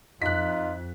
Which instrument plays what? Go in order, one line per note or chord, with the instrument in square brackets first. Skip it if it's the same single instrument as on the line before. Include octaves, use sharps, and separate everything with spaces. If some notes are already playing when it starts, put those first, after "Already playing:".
[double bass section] F2 [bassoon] D#4 [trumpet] F4 [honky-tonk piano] F#6 B6